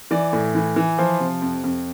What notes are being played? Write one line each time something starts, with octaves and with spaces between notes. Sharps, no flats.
E3 D5
A2
E3
E3
F3 C5
C3
F2
F2